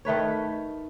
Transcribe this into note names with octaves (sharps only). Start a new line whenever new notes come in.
D#3 A3 B4 C#5